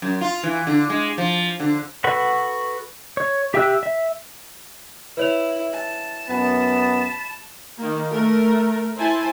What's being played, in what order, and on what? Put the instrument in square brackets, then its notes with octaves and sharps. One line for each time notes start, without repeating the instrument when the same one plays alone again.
[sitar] F#2
F4
E3
D3
G#3
F3
D3
[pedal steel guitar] F#4 A4 B4 F#5 C#6
C#5
G4 E5 G5 E6 F#6
E5
[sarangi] E4 [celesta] B4 C#5 F7
[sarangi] A5
[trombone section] F#2 B3 [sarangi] A5 [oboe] B5
[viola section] D#3 A#3
A3 A#4
E4 C5 G#5 A5